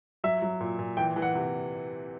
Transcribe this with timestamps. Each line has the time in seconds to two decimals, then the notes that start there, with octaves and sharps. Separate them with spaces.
0.24 F#3 E5
0.42 F#3
0.60 A#2
0.79 A#2
0.97 E3 G5
1.16 E3
1.22 F#5
1.35 C3